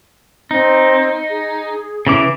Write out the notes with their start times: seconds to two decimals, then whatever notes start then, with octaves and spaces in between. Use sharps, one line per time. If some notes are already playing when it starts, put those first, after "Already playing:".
0.51 C4 D#4
1.30 G#4
2.07 C#3 E3 D6